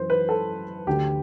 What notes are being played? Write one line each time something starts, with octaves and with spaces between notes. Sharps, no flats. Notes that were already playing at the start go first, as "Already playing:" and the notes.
Already playing: F#2 E3 C5
B4
A4
D2 D3 G4